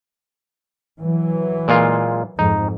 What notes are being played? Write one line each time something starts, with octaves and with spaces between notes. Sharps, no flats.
E3 F#3
A#2 G#3 F4
F2 G#2 D#4